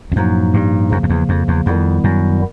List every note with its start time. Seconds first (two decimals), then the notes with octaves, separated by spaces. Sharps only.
0.12 F2
0.16 F#2 A2 F3 A#3 D#4
0.54 G2
0.91 F#2 C#3 F3 A#3
1.03 F2
1.10 E2
1.29 F2
1.48 E2
1.66 F2 D#3 G3 B3 E4
2.04 F#2